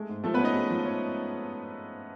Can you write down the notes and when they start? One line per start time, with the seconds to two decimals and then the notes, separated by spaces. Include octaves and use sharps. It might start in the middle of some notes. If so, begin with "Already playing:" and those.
Already playing: G#3 A3
0.09 G#2
0.24 F3 A3 A4
0.34 B3 B4
0.39 C#4
0.44 D#4 D#5
0.55 G#3
0.70 F3
0.85 C#4